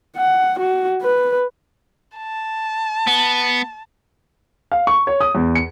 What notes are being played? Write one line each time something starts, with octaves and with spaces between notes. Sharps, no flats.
F#5
F#4
B4
A5
B3
F5
C#6
C#5
D#6
E2
C#7